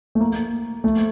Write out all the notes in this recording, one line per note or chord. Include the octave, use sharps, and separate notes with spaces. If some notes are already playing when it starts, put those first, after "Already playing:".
A3
A#3
A3